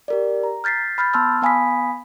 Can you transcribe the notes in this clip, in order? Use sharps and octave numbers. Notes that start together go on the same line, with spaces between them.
G4 A#4 D5
A#5
F6 G6 A6 B6 C7
B5 F6 G6 A6
B3 A5 C6 E6 F6
B3 F5 G#5 B5 D#6 B6